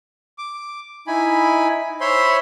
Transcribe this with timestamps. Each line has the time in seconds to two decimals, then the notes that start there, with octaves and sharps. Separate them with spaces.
0.38 D6
1.07 D#4 E4 G#5 B5
2.01 C5 C#5 E5 B5 C6